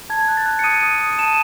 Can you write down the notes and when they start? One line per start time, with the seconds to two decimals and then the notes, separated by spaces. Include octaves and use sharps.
0.10 A5 G#6
0.28 F#6
0.37 A6
0.46 F#6
0.59 C#7
0.64 D#6 D#7
0.83 D#6
1.00 D#6
1.13 D#7
1.19 A5 E7